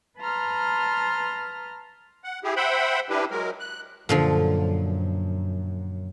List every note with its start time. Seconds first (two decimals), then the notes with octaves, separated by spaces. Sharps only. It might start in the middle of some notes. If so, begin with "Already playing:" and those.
0.19 B4 A5 A#5 C6 F6
2.24 F#5
2.44 E4 G4 G#4
2.56 C5 E5 F#5 G5 B5
3.10 E3 D4 E4 G4 B4
3.31 F#3 G#3 A#4
3.60 F#6
4.09 F#2 A#2 D3 F3